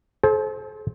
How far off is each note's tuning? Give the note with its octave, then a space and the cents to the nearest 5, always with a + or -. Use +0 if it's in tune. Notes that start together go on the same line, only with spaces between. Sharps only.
A4 -40 C5 +15